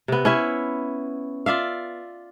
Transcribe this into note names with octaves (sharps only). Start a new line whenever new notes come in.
C3 B3
C#4 E4 E5
F4 D5 E5 F5